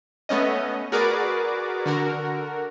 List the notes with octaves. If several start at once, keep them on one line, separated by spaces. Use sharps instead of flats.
A3 B3 C#4 D#5
F#4 G#4 A#4 B4 D5 D6
D3 F#4 A#4